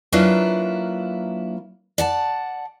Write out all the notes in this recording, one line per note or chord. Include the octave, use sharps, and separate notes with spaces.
F#3 A#3 D4 E4 F4 B4
D5 F#5 A5